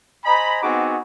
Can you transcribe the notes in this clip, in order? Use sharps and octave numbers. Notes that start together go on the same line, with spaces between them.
C5 D#5 G#5 A#5 B5
B3 C4 D#4 F#4 G#4 D6